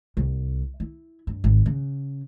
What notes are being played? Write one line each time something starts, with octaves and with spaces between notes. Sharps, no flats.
C2
E4
G2
G#1
C#3